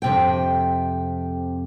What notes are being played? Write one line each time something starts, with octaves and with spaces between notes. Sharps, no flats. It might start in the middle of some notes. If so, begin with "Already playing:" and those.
F2 C3 G5